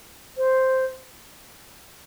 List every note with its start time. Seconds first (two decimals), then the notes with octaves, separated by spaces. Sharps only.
0.37 C5